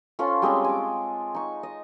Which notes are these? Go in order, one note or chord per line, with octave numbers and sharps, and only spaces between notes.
C#4 F4 A4 C5
G3 G#3 C4 C#4
G#5 D6
D#4 C#6
D#5